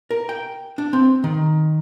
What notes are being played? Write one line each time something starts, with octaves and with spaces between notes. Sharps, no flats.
A#4
G5
D4
C4
D#3